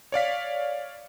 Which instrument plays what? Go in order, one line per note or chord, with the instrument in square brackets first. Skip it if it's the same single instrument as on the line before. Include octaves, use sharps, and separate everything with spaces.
[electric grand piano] C#5 D5 F5 B6